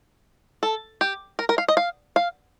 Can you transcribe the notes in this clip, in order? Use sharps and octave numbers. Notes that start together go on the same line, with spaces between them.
A4
G4
A#4
A#4
F5
D#5
F5
F5